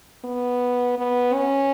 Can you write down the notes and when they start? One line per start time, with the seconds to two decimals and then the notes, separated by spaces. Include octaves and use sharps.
0.24 B3
0.98 B3
1.35 C#4